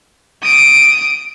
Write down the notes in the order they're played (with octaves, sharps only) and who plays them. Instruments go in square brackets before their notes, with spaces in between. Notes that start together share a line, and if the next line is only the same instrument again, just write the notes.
[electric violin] D#6 D7